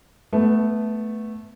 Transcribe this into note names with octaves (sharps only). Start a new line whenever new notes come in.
A3 B3